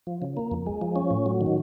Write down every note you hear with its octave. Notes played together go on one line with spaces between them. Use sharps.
F3
C#3
A#3
F2
G#3
F3
C#4
A2
F#3
D#3